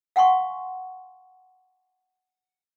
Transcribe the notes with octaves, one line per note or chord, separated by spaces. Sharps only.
F5 F#5 G#5 C6 C#6